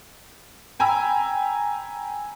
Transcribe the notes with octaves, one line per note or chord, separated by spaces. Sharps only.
G5 G#5 A#5 B5 E6